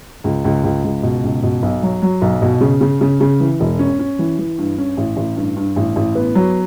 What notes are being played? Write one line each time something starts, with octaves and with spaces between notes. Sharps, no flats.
C#2
C#2
C#2
C#2
B2
C#2
B2
B1
F#3
F#3
B1
B2
C#3
C#3
C#3
C#3
E3
E1
C#4
C#4
E3
E3
G2
C#4
A1
A1
G2
G2
A1
A1
B3
F#3